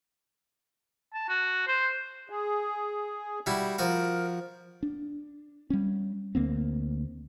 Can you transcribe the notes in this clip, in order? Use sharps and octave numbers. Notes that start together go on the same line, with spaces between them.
A5
F#4
C5
G#4
G3 E4 F#4
F3 F#4 A#4 F5
D4
G3 C#4
D2 A#3 C4